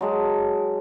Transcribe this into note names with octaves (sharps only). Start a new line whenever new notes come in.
F#3 G#3 A5